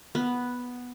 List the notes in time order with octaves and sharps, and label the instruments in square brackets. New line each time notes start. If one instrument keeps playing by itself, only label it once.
[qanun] B3